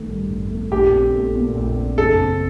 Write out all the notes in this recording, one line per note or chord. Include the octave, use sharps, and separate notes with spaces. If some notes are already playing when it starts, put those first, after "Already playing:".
Already playing: A1 D#3 A3
G2
A1
A3
A#1 G4
C4
A3
A#2
A#1
C4
F#1 A4
C4